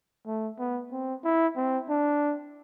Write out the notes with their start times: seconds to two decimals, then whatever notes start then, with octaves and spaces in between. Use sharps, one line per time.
0.27 A3
0.59 B3
0.92 C4
1.24 E4
1.56 C4
1.89 D4